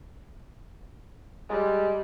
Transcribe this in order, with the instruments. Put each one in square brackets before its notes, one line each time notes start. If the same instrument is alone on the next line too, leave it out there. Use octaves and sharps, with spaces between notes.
[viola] G3 [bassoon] G#3